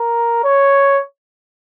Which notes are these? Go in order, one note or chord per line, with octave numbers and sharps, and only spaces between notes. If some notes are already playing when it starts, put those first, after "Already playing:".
Already playing: A#4
C#5